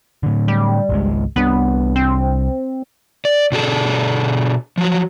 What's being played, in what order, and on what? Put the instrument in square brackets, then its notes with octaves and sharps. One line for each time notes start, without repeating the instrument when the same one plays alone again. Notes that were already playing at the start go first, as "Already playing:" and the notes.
[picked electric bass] A2 D3
[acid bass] G3
[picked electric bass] G#1 C#2 G#3
[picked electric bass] C2 G3 D4 [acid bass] B3
[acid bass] C4
[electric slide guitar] D5
B2 D4 G#4 A4
F3 F#3